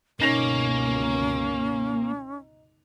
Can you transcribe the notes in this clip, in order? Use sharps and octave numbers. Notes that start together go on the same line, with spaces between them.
G1 C#2 B2 A#3 C#4 D#4 A#6 F7